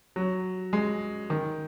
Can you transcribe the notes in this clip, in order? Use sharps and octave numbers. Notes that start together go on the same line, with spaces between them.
F#3
G#3
D#3